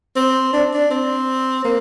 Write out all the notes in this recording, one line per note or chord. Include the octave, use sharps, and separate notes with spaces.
C4
D4
D4
C4
A#3